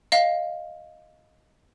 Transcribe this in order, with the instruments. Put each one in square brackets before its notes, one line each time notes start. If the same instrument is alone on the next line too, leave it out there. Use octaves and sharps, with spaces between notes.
[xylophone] D#5 F5